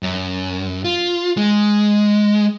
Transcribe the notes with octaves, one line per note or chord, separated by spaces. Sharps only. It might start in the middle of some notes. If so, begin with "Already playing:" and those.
F#2
F4
G#3